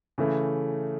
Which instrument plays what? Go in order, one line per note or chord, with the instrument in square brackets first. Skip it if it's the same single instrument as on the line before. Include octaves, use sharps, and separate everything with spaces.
[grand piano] C#3 E3 A3